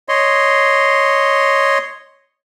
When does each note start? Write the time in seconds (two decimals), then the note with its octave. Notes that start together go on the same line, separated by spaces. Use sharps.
0.09 C#5 D#5 C6